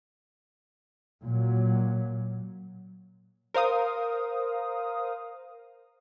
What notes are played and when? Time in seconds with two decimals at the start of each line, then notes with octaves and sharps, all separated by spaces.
1.23 A#2 F#3
3.54 A#4 C5 F5 D#6